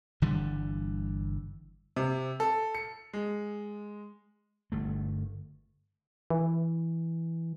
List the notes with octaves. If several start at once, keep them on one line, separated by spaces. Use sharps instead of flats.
G1 D3 E3 G3
C3
A4
C#7
G#3
G1 A3
E3